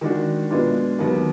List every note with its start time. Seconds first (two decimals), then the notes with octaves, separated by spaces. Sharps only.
0.01 D#3 G#3 D4 F#4
0.50 B2 G#3 B3 D4 F4
0.99 D#2 D#3 F#3 B3